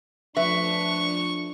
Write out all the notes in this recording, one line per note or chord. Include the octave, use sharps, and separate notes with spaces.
F3 A3 D4 B4 E5 C#6